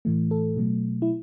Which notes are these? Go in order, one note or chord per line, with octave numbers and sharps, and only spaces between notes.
A2 E3 A3
A4
B2 F#3 A3
E4